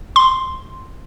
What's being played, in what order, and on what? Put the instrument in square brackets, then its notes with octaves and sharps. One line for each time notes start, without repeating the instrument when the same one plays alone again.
[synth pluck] C6